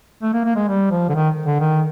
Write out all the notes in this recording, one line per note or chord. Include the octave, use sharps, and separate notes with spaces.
A3
A#3
A#3
G#3
G3
F3
D3
D#3
D3
D#3